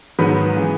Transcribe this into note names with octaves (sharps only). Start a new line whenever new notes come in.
G#2 D#3 F#3 B3 B4
C#3 E3